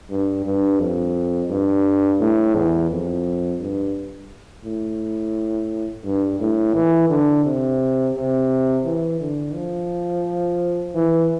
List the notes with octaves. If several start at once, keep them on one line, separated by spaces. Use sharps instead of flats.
G2
G2
F2
G2
A2
E2
F2
G2
A2
G2
A2
E3
D3
C3
C3
E3
D3
F3
E3